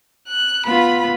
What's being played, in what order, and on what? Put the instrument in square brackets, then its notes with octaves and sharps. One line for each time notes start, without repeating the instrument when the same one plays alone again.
[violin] F#6
[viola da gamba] B3 F4 [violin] B5